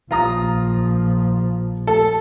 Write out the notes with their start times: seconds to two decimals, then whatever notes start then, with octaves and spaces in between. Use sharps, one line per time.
0.11 A#1 F3 F4 A#5 D#6
1.87 A4